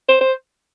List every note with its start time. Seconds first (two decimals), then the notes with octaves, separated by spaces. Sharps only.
0.08 C5
0.21 C5